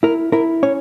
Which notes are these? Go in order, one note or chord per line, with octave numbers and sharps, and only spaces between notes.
E4 A#4
E4 A#4
C#4 C#5